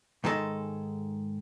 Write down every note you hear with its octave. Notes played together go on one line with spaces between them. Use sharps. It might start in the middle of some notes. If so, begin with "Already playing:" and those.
G#2 D#3 G#3 A4 D#5